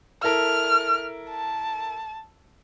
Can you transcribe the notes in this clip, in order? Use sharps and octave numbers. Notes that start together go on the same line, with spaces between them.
E4 A4 A#4 F6
A5